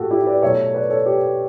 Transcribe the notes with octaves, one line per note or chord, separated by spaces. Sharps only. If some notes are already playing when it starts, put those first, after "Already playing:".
Already playing: A2 F#4 G4 A4
E4 G4
B4 D5
B2 F#3 A3 C#5 E5
B4 D5
A4 C#5
G4 B4